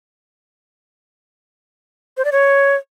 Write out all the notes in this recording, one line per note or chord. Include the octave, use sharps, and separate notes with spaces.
C5
D5
C#5